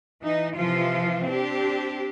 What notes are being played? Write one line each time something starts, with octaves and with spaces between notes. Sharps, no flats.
E3 D#4
C3 E3 F3 F4
C4 D4 G4